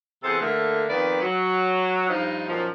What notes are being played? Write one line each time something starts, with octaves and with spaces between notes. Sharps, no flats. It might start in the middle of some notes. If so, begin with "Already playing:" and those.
E2 C3 G#4 A4 C5 F#5
D3 A3 A#3
F2 D#3 A#3 B3 B4 D5
F#3
G2 F3 D#4
F#2 A#2 D#3 F3